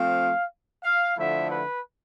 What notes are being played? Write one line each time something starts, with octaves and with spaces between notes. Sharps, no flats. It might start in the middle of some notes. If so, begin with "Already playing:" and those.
Already playing: F3 A3 C4 F5
F5
D3 F3 A3 E4 E5
B4